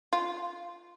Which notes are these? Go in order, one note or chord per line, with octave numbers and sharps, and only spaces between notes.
F4